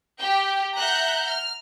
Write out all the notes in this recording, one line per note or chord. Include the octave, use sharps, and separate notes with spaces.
G4 G5
E5 F#5 A#5 F#6 G6
F6